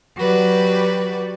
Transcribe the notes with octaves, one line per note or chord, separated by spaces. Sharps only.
F#3 F#4 G4 B4 D5